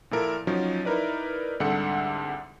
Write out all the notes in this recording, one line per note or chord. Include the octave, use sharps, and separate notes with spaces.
A#2 F3 E4 A4 A#4 D7
F3 F#3 C#4 D#4
D#4 E4 A#4 B4 D5
C2 G#2 D3 A4 F#5 C#7